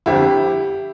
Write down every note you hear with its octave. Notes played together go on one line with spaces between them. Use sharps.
G1 F2 D3 F3 E4 G4